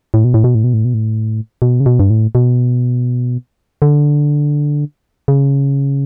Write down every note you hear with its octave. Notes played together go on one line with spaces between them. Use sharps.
A2
B2
A2
B2
A2
B2
A2
B2
A2
B2
C#3
B2
G2
A2
B2
D3
C#3